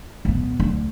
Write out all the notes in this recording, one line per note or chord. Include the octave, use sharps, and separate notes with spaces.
D#1 B3
D2 D3